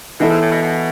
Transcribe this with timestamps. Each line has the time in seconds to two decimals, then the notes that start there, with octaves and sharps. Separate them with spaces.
0.20 B2 E3 B3 E4 A4
0.30 G#2
0.41 A2
0.52 B2
0.62 B2